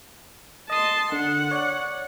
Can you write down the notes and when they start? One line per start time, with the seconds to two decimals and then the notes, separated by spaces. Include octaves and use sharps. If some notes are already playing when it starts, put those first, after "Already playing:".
0.70 D#5 A5 C6 D#6
1.12 D3 F#5
1.51 C#5 D5